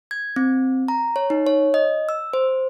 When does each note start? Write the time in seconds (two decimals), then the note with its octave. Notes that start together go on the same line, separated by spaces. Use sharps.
0.11 G#6
0.36 C4
0.88 A#5
1.16 C#5
1.30 D#4
1.47 C#5
1.74 D#5
2.09 E6
2.33 C5